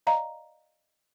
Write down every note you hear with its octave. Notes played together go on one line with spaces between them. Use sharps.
D5 D#5 F5 A#5